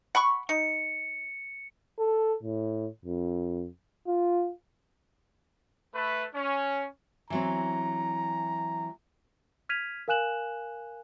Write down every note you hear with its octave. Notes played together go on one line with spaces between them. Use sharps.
F#5 B5 C#6
D#4 C#7
A4
A2
F2
F4
A3 B4
C#4
E3 F#3 C4 A#5
F6 G#6 B6 D#7 F7
A#4 F5 G#5 F#6 E7 F#7